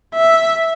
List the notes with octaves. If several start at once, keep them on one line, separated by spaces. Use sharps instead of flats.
E5